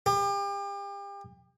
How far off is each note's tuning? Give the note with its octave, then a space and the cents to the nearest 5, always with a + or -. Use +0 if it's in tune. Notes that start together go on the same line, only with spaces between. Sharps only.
G4 +35